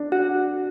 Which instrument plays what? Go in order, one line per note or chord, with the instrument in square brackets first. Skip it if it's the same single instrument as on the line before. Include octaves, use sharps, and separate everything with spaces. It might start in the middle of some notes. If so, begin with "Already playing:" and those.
Already playing: [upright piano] D4
[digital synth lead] F#4